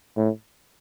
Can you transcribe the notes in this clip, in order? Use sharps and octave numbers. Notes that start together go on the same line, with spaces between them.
A2